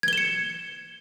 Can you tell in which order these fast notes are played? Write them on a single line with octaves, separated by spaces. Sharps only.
G#6 G7 E7 C#7